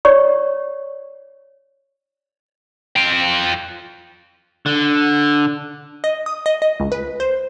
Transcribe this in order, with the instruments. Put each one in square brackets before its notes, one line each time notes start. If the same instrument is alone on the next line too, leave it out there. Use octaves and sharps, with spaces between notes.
[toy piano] C#5 D5 C#6
[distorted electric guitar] F4 G5
[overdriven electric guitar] D3
[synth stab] D#5
D#6
D#5
D#5
C#2
B4
C5